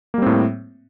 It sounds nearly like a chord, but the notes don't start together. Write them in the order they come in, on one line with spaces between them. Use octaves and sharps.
A#3 G3 C4 A2